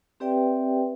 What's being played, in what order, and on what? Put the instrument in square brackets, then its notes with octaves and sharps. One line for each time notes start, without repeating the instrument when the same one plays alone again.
[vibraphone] C4 G4 B4 D5 E5 G5